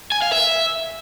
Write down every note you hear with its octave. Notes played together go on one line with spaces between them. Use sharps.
G#5
F5
E5